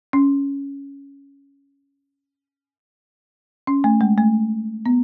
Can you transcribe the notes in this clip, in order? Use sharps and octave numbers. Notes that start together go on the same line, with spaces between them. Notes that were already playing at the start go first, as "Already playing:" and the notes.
C#4
C#4
A3
G#3
A3
B3